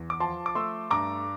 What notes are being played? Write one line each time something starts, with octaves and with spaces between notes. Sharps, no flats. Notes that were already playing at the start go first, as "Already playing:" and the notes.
Already playing: E2
D6
F3 A5 C6
D6
A3 C6 E6
G2 A#5 D6